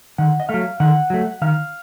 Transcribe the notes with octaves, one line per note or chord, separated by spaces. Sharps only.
D#3 F#5
D#5
F#3 A3 F5
D#3 F#5
F#3 A3
D#3 F5